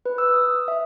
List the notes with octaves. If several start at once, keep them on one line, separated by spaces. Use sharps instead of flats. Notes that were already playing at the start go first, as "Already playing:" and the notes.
B4
E6
D#6
E5